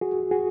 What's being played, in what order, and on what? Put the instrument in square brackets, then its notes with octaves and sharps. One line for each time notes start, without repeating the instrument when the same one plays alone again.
[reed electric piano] F#4 G#4
F#4 G#4